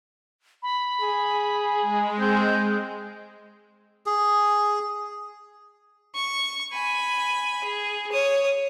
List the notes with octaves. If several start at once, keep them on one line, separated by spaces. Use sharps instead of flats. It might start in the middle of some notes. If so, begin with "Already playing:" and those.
B5
G#4
G#3
C4 G6
G#4
C#6
G#5 B5
G#4
C#5 D#6